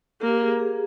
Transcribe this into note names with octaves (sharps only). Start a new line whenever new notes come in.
A#3 G4
G#4
G#4